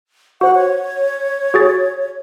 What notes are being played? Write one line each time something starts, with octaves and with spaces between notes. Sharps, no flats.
F#4 C5 F#5
C#5
F#4 G#4 A6